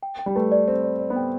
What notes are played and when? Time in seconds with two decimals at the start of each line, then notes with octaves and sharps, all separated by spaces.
0.03 G5
0.19 G5
0.26 G3
0.35 A3 B4
0.52 D5
0.68 C4 D5
0.84 D5
0.99 D5
1.10 B3
1.16 G5